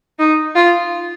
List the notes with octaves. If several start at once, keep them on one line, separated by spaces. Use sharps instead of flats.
D#4
F4